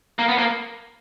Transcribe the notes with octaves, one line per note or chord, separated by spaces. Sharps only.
A#3
B3
A#3